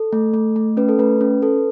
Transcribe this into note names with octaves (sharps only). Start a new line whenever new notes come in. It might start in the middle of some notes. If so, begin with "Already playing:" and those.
Already playing: A4
A3
A3
A3
C#4 B4
A4
A3 B4
C#4
A4